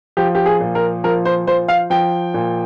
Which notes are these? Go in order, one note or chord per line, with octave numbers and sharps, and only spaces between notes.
F3 G4
G4
G#4
A#2
A#4
F3 A#4
C5
F3 C5
F5
F3 G5
A#2